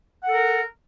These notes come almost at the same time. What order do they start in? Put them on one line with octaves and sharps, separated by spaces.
F#5 A4 A#4